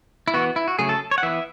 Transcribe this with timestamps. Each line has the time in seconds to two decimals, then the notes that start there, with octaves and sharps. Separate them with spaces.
0.28 E4
0.34 E3 B3 F#4
0.56 E4
0.68 F#4
0.79 C#3 F#3 A3 G#4
0.89 A4
1.11 C#5
1.18 F#5
1.23 E3 B3 E5